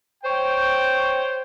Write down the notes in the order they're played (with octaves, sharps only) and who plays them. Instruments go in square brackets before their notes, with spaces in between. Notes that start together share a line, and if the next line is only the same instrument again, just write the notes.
[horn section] C5 C#5 G5